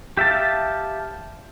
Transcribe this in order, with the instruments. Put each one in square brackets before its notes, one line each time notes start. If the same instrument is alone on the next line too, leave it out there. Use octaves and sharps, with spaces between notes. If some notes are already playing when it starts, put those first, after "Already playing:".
[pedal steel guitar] G4 E5 F5 A5